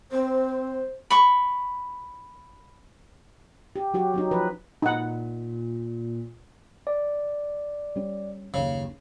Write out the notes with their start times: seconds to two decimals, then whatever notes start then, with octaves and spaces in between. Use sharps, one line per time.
0.12 C4 C5
1.10 B5 C#6
3.76 G4
3.94 F#3 F#4 G4
4.14 F#3 C#4 D#4
4.31 F3 B4
4.82 A#2 D#4 F#5
6.87 D5
7.96 G3 C#4
8.54 F#1 D#2 C#3